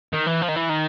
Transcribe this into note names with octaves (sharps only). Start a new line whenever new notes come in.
D#3
E3
F3
D#3
E3
D#3